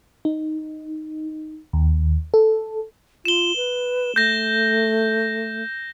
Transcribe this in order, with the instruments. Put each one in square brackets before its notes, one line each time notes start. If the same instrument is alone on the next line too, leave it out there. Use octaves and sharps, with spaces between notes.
[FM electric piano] D#4
D#2
A4
[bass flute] F4 [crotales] E7 G7
[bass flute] B4
[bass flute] A3 [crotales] G6 A#6